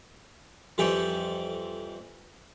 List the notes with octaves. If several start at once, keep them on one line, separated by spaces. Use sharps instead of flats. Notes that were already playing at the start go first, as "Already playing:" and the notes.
F2 E3 G3 G4 A4 G5